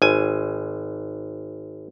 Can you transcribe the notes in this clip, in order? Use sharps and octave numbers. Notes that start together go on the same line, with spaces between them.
G#1 G#5